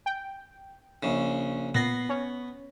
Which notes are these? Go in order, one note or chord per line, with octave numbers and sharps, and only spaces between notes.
G5
A#1 C#3
A#2 B3 A#6 C7
C#4 C#5